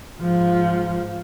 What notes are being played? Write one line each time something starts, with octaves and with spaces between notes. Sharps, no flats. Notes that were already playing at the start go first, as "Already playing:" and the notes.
G#2 F3